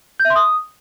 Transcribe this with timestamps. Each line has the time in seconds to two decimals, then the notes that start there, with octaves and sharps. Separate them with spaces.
0.20 G6
0.25 E5
0.30 C6
0.36 D#6